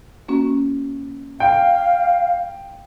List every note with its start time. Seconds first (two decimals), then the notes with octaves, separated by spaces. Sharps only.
0.29 A#3 C#4 F#4
1.40 F5 G5